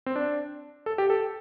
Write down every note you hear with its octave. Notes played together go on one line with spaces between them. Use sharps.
C4
D4
A4
G4
A4